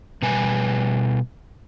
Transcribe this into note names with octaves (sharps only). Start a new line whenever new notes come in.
B2 G3 B4 G#5